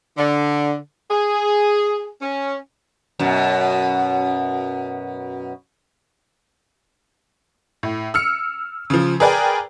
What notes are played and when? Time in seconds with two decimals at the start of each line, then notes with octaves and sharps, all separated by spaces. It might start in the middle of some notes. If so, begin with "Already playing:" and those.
0.18 D3
1.10 G#4
2.22 C#4
3.19 F#2 B2
7.83 A2
8.14 E6 F6 C#7
8.90 C#3 F3
9.20 G#4 A#4 B4 D5 G5 G#5